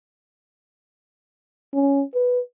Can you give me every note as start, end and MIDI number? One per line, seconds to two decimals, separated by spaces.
1.74 2.03 61
2.15 2.40 71